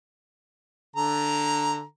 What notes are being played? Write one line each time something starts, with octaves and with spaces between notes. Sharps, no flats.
D3 A4 A#5